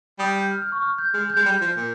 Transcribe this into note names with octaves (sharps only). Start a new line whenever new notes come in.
G3 D#6
G6
F6
F6
C#6
F6
G6
G#3 F6
G6
G#3
G3
F3
A#2